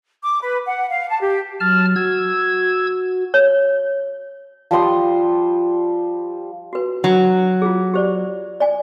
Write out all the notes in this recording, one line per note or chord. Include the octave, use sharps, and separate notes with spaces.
D6
B4
F#5
F5
A5
G4
F#3 A5 F6
F#4 E6 G#6
C#5
F3 G3 C6 D#6
F#4 B4
F#3
F4 G#4
G4 C5 D5
D5 G#5